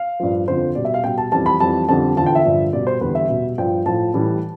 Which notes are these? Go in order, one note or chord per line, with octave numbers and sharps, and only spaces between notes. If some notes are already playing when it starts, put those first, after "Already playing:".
Already playing: F5
G2 F3
F2 D3 F3 C5
B2 G3 D5
E5
F5
B2 G3 G5
A5
F2 E3 G3 A5
B5
F2 E3 G3 A5
F2 D3 G3 A5
E2 D3 F3 A5
G5
E5
G2 D3 F3
B2 G3 D5
C5
E2 D3 G3 B4
E5
B2 G3
G2 F3 G5
A2 F3 A5
A2 E3 G3